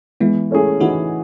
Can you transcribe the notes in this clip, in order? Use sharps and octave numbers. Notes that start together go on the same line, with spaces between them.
E3 G#3 B3
A3 C#4 E4 G#4
E3 D#4 F#4